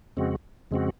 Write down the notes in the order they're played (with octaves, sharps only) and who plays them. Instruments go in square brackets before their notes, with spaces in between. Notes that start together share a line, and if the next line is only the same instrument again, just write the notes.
[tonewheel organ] F2 C#3 G#3 C4 F#4
F2 C#3 G#3 C4 F#4